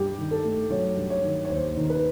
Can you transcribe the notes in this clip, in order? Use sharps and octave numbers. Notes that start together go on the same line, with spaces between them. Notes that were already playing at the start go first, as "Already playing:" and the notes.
Already playing: G2 G4
D#3
A4
A3
F#3 C#5
G2
C#5
D#3
C#5
D#2 C5
D#3
B4